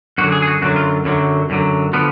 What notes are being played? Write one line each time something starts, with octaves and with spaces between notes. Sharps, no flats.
F#2 D3 F#3 F#4
G#4
G#4
F#4
F#2 D3 F#3 F#4
F4
F#2 D3 F#3
F#2 D3 F#3
D3 F3 B3